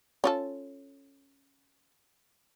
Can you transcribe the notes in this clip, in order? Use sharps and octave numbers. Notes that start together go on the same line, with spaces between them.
C#4 F4 A4